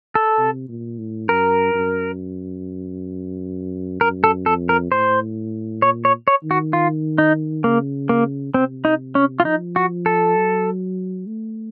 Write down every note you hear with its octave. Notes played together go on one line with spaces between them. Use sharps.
A4
C3
A#2
A2
F#2 A#4
F#2
F#2 A#4
A4
F2 A4
A#4
A2 C5
A#2 C#5
C#5
C#5
D#3
F#4
F4
D#4
C#3 A#3
A#3
C3 C4
D#4
C#4
F4
F3 D#4
F#4
A4
F#3
A3